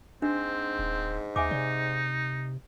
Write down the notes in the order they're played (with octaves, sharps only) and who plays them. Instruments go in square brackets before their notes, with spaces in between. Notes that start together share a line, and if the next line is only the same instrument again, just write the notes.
[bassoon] G#2 [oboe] C4 [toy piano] D4
[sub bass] D#1
[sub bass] D#2 [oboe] D#4 [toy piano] E5 G#5 D6
[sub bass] C3 [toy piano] D5